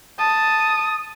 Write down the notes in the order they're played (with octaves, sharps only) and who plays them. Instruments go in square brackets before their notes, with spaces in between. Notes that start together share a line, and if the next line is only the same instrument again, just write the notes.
[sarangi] A5 [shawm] D#6